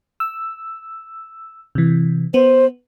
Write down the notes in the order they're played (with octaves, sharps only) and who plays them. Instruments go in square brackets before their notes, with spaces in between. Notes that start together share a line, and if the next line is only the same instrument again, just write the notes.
[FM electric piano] E6
C3 E3
[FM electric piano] B3 [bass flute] C5